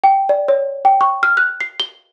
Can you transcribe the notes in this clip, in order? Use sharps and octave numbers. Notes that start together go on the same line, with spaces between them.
G5
D5
C#5
G5
C#6
F6
F#6
C7
G7